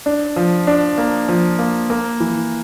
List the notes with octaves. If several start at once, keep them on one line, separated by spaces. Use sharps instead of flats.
D4
F3
D4
A#3
F3
A#3
A#3
E3